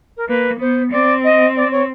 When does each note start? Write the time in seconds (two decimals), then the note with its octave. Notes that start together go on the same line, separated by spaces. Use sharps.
0.17 A#4
0.28 A#3 B4
0.59 B3 C5
0.91 C4 D5
1.24 D#5
1.56 D5
1.71 C#5